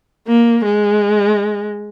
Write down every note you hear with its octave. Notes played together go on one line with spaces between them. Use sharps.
A#3
G#3